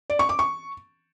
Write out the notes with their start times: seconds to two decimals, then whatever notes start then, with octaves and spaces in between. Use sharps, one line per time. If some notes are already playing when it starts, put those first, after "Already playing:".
0.10 D5
0.19 C#6
0.29 D6
0.39 C#6